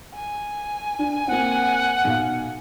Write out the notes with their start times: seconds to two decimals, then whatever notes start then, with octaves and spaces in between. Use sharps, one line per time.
0.15 G#5
0.99 D4
1.27 A#3 C4 F#5
2.04 B1 F5